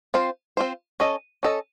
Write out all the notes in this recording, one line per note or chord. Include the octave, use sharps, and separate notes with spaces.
C4 F4 C5
C4 F4 C5
C#4 A4 D#5
C#4 A4 D#5